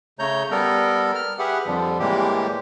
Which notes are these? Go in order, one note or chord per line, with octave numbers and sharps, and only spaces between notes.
C#3 A3 C#5 A#5 G6
G3 B3 A4 A#4
F6
G4 G#4 B4 E5 F#5
F2 D3 F3 G3
A2 E3 G3 G#3 A#3 G4